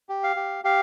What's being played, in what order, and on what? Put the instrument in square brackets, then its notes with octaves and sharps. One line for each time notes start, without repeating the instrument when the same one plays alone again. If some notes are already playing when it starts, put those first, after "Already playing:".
[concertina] G4
F5
G4
G4 F5